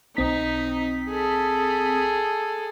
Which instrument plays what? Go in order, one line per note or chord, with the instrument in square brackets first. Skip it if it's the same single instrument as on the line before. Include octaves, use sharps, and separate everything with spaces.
[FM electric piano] B1 C4 B6 [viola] D#4
[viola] G#4 A4